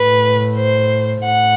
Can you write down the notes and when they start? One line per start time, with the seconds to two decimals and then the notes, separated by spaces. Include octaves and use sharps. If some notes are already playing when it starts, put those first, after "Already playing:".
Already playing: A2 B4
0.56 C5
1.25 A2 F#5